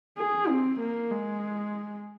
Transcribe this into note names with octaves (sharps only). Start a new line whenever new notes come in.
G#4
C4
A#3
G#3